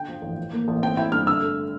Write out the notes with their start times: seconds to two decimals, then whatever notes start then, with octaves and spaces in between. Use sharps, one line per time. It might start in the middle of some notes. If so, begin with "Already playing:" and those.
Already playing: D3 G5
0.08 F3
0.22 A1
0.37 F3
0.53 A#3
0.68 A1
0.82 C4 G5
0.97 E4 G5
1.12 G2 F6
1.27 D3 E6
1.42 A3